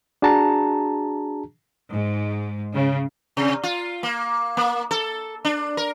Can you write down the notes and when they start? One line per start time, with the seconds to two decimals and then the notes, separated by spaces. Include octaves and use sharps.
0.22 D4 F#4 G#4 A5 A#5
1.91 G#2
2.74 C#3
3.37 C3
3.63 F4
4.03 A#3
4.57 A#3
4.91 A4
5.45 D4
5.77 A#4